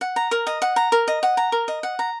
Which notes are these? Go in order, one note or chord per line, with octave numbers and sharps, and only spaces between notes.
F#5
A#5
A#4
D#5
F#5
A#5
A#4
D#5
F#5
A#5
A#4
D#5
F#5
A#5